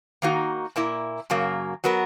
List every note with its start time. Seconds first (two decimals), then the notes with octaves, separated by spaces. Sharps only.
0.22 D#3 A#3 D#4 F#4
0.76 A#2 A#3 E4
1.30 F#2 C#3 F#3 A#3
1.84 F#3 B3 F#4 A#4